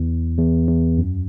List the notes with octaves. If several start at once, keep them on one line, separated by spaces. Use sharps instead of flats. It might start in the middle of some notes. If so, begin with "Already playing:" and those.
Already playing: E2
E2
E2
F#2